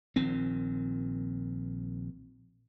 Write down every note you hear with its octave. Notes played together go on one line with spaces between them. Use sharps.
A#1 A#2 D#3 C4